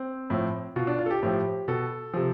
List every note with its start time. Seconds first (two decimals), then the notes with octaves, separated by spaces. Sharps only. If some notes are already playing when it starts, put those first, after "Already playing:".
Already playing: C4
0.30 A2 F3
0.76 B2 F4
0.87 D4
0.99 F4
1.06 A4
1.11 G4
1.23 A2 F3 G4
1.68 B2 A4
2.14 C3 F3